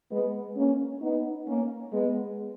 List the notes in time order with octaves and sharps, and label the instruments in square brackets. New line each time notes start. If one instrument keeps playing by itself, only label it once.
[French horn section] G#3 B3
A#3 C#4
B3 D#4
A#3 C#4
G#3 B3